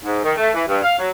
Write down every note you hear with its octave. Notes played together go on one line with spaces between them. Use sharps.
G#2
D#3
A3
E3
G2
F5
F#3